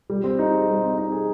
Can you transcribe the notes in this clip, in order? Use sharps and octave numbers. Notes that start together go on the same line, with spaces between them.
G3
C4
D#4
G#4
G3
C4
D#4
G#4